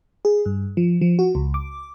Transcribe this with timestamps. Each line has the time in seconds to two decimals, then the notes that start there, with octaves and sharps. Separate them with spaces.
0.25 G#4
0.46 G2
0.77 F3
1.01 F3
1.19 F#4
1.35 C#2
1.54 D6